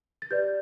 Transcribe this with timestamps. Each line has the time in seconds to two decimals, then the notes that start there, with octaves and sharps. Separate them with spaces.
0.22 A6
0.31 G4 B4 D5 G6